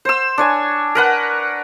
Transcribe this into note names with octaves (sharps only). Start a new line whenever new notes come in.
C5 E6
D4 C#5 G#5
A#4 B4 F#5